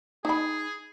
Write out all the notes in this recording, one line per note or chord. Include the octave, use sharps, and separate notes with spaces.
D#4 G#4 B5